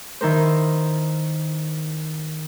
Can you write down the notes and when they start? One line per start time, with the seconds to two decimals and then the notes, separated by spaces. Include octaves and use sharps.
0.21 D#3 E4 A#4 C5